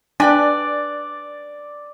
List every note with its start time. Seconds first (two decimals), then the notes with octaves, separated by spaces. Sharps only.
0.20 D4 B4 D5 G5 G#5